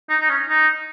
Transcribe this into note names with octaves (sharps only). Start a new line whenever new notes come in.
D#4
D#4
C#4
D#4